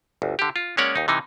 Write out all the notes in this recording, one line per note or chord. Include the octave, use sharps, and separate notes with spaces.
G1 D2
D3 G4
F4
G#3 A#3 C#4 C#5 D5 F#5
D#2 D#4
C3 E3 D#4